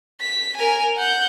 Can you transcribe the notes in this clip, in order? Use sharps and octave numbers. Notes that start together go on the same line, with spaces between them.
B6
A#4 G#5
F#5 G6